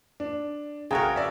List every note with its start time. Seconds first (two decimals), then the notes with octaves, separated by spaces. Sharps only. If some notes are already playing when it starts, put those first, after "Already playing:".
0.20 D4
0.91 C#3 F#4 A#4 G5 A#5 G#6
1.16 D5 E5